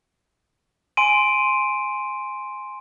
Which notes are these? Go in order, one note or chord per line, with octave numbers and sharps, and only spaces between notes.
G#5 C6 D7 D#7